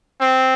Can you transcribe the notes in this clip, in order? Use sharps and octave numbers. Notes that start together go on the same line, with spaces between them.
C4